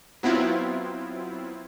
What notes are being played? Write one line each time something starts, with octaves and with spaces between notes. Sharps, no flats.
F#3 B3 C4 E4 F4